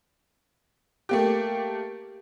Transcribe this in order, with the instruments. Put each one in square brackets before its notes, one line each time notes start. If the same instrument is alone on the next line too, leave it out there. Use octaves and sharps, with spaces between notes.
[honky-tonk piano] A3 A#3 G4